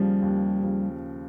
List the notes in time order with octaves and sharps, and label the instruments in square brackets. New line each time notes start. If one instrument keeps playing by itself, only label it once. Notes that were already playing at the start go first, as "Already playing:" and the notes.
Already playing: [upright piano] D#2 C#3 F3 [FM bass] G3
[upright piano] D#2
C#3 F3